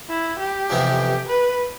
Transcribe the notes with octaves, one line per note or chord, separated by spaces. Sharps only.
E4
G4
F2 C3 E3 B3 E4
B4